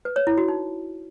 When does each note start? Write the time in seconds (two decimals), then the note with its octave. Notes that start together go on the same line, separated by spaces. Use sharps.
0.05 B4
0.16 C#5
0.27 E4
0.38 F#4
0.48 D#4